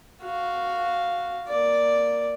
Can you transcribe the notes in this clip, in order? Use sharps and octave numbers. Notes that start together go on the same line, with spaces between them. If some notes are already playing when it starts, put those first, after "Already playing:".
F#4 F5
A#3 D5